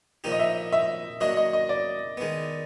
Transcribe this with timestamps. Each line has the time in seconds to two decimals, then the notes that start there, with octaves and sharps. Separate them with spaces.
0.24 A#2 F3 A#3 D#4 G4
0.32 D#5
0.39 E5
0.72 E5
1.21 F#3 A#3 D4 F#4 D#5
1.37 D#5
1.53 D#5
1.69 D5
2.17 D#3 G#3 B3